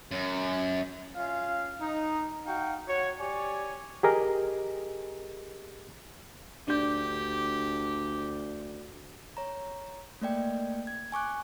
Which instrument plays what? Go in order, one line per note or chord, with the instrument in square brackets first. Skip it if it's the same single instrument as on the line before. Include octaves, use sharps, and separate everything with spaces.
[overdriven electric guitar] F#2
[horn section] C#4 F4 F5
D#4
D#4 F#4 F5 G5
F#4 C#5
G4 C#5 D5 G#5
[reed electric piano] G4 G#4 A#4 D#5
[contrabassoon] D2 [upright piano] D4 G6 [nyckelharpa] G4
[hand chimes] C#5 A#5
A3 A#3 D5 G5
G#6
G#5 C#6 D6 F#6